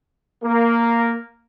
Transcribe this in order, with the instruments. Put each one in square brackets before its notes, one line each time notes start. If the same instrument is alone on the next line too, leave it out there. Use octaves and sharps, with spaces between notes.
[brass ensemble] A#3